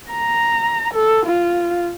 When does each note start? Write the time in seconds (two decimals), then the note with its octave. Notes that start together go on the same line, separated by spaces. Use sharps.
0.11 A#5
0.94 A4
1.26 F4